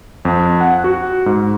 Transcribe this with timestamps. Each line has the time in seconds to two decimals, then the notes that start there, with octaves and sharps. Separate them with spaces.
0.25 F2
0.61 F#5
0.84 F#4
1.26 G#2